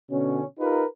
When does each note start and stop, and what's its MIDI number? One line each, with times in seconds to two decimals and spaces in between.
0.11 0.43 47
0.11 0.43 50
0.11 0.43 61
0.59 0.84 63
0.59 0.84 65
0.59 0.84 67
0.59 0.84 70
0.59 0.84 71